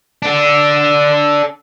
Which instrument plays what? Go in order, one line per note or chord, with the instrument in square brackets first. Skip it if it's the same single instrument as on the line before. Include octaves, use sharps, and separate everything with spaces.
[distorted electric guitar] D4 A4